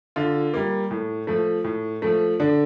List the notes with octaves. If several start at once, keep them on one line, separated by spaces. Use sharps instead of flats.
D3 F4
G3 A#3
A2
F3 A3
A2
F3 A3
D3 D4